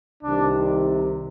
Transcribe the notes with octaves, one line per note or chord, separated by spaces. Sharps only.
C2 C3 D#3 D4